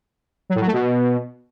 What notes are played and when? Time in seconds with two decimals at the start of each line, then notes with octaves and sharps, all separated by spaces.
0.49 F#3
0.55 A2
0.61 F#3
0.67 A3
0.73 B2